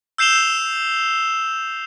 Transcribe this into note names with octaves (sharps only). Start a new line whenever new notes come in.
E6 G6 C7 E7 F7 G7